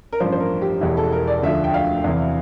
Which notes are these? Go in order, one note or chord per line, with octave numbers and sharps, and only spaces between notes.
A#4
A1 G2 F3 C5
C5
A#4
G4
E1 E2 E3 G4
A4
A#4
D5
D2 D3 F3 E5
G5
F5
E2 C3 E3